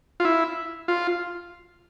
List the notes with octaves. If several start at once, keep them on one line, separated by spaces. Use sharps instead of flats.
F4
E4
F4